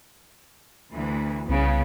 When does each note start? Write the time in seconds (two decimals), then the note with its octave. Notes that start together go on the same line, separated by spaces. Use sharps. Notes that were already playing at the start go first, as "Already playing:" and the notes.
0.92 D2 E3
1.49 C2 C#3 B3